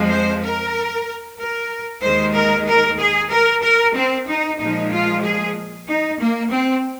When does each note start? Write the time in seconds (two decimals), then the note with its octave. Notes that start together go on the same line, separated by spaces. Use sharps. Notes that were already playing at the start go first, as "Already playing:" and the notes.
Already playing: F2 F3 G#3
0.09 C5
0.42 A#4
1.38 A#4
2.02 D#2 D#3 G#3 C5
2.34 A#4
2.67 A#4
2.99 G#4
3.31 A#4
3.63 A#4
3.95 C4
4.28 D#4
4.59 A#2 F3 G#3 D#4
4.92 F4
5.24 G#4
5.88 D#4
6.20 A#3
6.52 C4